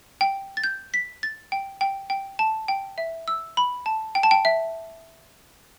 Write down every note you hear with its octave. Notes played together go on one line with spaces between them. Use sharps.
G5
A6
G6
B6
A6
G5
G5
G5
A5
G5
E5
E6
B5
A5
G5
A5
G5
E5